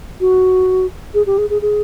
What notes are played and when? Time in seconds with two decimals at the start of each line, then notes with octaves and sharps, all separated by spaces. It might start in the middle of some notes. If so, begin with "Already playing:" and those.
0.21 F#4
1.14 G#4
1.26 G4
1.38 G#4
1.50 G#4
1.62 G#4